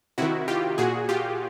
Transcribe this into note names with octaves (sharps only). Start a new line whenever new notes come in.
C3 D#3 E4 F#4
F4 G4
A#2 F#4 G#4
F4 G4